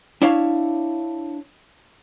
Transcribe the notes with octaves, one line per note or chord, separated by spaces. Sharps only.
D4 E4 C#5 F5